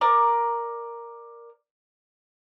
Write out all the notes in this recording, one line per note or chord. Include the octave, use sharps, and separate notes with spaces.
A#4 D5